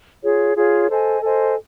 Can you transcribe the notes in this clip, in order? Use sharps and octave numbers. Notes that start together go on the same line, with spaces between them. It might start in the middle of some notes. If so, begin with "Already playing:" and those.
F4 G#4 C#5
F4 G#4 C#5
A4 C5 D#5 G#5
A4 C5 D#5 G#5